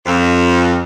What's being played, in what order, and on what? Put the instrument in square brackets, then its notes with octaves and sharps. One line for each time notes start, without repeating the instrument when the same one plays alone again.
[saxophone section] F2